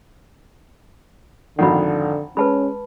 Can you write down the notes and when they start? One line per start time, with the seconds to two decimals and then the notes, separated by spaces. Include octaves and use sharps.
1.59 G#1 F2 D3 D#3 F#5 B5
2.37 G#3 C#4 B4 A5 B5